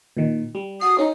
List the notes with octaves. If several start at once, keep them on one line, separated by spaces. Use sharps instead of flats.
A#2 D#3
G3
F#4 D#6 C7
C#4 D#4